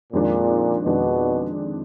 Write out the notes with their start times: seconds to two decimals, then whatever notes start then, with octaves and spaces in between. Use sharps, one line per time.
0.13 F2 A#2 D#3 G#3 D4
0.85 F2 B2 D#3 G#3 D4